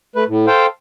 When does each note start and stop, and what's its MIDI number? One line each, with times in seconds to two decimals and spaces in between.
0.16 0.24 57
0.16 0.24 71
0.28 0.46 45
0.47 0.66 69
0.47 0.66 72
0.47 0.66 77
0.47 0.66 79